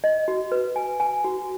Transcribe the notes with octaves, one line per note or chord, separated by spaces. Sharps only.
D#5
F#4
B4
G#5
G#5
F#4